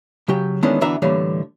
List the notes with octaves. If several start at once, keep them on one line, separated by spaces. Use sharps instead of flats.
C#3 F#3 G4 G5
D#3 E3 G#3 B3 C#4 D4
D2 E3 B3 D4 E5 A#5
A2 D3 E3 G3 A#3 C#5